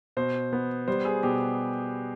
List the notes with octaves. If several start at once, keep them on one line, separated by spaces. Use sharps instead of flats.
B2 C5
B3
G3 C5
G#4
B2 G4